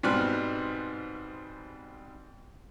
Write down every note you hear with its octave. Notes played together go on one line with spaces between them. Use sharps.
G#2 B2 G3 C4 F6 F#6